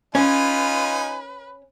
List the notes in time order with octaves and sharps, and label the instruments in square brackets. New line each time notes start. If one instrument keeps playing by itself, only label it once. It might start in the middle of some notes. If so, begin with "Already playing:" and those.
[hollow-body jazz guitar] C#4 [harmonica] D#4 F4 G#5 [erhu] B4